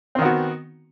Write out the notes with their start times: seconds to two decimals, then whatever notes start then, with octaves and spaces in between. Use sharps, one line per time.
0.15 C4
0.18 D#3
0.22 B3
0.25 F#4